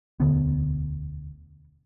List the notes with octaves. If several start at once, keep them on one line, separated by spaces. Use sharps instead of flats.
E1 D2 D3 B3